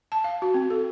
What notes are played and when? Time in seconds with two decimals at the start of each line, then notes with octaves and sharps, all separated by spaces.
0.12 A5
0.24 F5
0.42 F#4
0.54 C4
0.70 A4